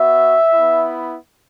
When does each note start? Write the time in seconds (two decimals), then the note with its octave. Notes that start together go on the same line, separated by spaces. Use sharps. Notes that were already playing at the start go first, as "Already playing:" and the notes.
Already playing: B3 F#4 E5
0.53 B3 E4